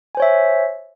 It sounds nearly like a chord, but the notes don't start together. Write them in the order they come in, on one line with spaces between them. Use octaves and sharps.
G#5 C5 C#5 E5